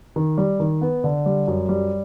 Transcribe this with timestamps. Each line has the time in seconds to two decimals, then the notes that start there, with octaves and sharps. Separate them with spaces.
0.16 D#3
0.38 G3
0.60 D#3
0.81 B3
1.04 D3
1.26 G3
1.47 F#2
1.69 G3